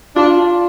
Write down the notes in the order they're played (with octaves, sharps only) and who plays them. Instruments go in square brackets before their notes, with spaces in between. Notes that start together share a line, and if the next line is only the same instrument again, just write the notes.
[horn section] D4 [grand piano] F4